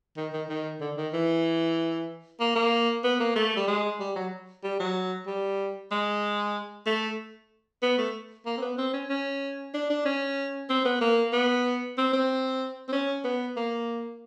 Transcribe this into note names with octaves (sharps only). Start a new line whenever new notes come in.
D#3
D#3
D#3
D3
D#3
E3
A#3
A#3
B3
A#3
A3
G3
G#3
G3
F#3
G3
F#3
G3
G#3
A3
B3
A3
A#3
C4
B3
C4
C#4
C#4
D4
D4
C#4
C4
B3
A#3
B3
C4
C4
C4
C#4
B3
A#3